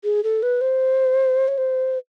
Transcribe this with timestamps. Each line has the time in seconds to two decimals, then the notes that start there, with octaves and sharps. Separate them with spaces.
0.04 G#4
0.23 A4
0.43 B4
0.61 C5
1.48 C#5
1.58 C5